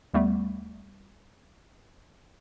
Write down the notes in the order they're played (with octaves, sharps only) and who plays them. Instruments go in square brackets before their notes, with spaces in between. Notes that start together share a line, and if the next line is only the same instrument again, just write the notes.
[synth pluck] D#2 G3 A3 B3